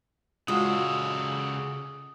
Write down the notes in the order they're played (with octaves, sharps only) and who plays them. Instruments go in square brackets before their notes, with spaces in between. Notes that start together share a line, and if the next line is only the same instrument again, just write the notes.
[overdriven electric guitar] C#3 A4 [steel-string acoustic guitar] G#3 [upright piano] F4 F#4 [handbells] D#6